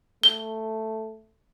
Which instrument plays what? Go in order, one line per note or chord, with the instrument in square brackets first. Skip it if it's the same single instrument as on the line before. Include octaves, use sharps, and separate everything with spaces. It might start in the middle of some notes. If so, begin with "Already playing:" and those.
[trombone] A3 [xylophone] G7